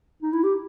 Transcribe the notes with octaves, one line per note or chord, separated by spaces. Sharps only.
D#4
E4
G4